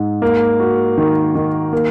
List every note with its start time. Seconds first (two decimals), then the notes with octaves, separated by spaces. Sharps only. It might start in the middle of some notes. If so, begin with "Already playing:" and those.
Already playing: G#2
0.22 A#3
0.60 F#4
0.98 D#3
1.35 D#3
1.73 A#3